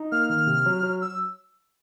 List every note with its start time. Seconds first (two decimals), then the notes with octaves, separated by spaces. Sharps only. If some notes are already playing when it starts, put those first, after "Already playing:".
Already playing: D#4
0.12 A#3 F6
0.30 D#3 F6
0.47 C3
0.66 F#3
0.83 F#3
1.01 E6